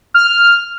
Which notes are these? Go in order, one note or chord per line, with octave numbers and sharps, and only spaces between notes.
F6